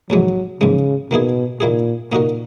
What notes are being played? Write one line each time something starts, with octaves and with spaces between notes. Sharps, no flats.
A#1 G#2 E3 F#3 G#3
A#1 G#2 C#3 E3 G#3
B2 D#3 A#3 E4 G#4
A#2 D#3 A#3 E4 G#4
A#2 D#3 A#3 D#4 F#4 A#4